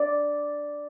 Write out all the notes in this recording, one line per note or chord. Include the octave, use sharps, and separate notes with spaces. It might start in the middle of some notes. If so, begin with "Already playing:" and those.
Already playing: D5